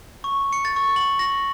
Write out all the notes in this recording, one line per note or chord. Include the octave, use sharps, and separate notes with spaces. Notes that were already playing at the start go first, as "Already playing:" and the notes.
C#6
C#7
A6
C#6
F#7
A#6